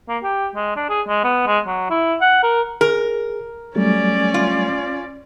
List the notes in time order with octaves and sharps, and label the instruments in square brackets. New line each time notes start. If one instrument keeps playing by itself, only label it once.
[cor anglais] A#3
G4
G#3
D4
G#4
G#3
B3
G#3
F#3
E4
F#5
A#4
[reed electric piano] G#4 [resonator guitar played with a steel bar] A#4
[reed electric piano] F#3 G3 A3 [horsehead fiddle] C#4 D5
[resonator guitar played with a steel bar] F4